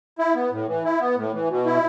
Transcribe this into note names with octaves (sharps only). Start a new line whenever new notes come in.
E4
B3
A2
E3
E4
B3
A2
E3
B2
E4